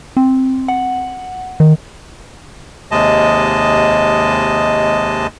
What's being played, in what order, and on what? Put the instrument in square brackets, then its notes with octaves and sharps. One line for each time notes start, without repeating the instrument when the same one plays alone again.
[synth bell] C4
F#5
D#3
[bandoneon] D#2 C3 G#3 D#5 A5